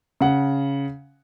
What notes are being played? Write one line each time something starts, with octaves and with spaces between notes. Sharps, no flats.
C#3 F#5